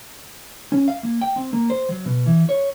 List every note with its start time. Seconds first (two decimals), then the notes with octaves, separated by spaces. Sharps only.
0.72 C#4
0.88 F5
1.03 A#3
1.21 G5
1.36 C4
1.53 A#3
1.70 C5
1.89 F#3
2.06 B2
2.26 E3
2.49 C#5